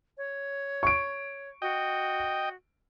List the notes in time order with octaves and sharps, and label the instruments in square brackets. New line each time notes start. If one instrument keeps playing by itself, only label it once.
[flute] C#5
[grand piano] C#6 D7
[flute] F#4 [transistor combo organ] D#5 G5